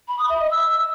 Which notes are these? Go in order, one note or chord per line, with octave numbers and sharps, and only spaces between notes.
B5
D#6
E5
D#5
E6